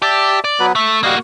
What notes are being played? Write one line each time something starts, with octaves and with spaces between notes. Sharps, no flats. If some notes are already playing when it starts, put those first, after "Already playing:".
G4 D5 E5 A5
D5
F#3 B3 B4
A3 E5
G3 A#3 F#4 D#5 F5